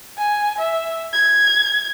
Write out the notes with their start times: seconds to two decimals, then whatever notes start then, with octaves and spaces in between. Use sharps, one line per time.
0.18 G#5
0.59 E5
1.13 G#6